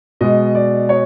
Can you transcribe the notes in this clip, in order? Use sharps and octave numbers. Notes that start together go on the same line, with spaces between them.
B2 G#3 D#5
D5
C#5